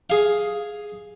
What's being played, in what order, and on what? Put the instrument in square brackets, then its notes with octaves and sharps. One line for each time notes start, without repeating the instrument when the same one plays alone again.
[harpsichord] G#4 F5